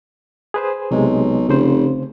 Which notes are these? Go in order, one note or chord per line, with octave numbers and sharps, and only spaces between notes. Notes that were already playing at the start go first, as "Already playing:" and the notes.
G#4 B4 C5
B1 C3 G#3
F1 C#3 C5